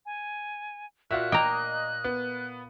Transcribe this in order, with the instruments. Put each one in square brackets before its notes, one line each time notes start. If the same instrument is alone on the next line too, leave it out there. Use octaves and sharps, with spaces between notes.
[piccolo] G#5
[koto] A#2 [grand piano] F4 F#4 E5 [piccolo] F#6
[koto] A#3 [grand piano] D#5 [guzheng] G5 A#5
[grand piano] B3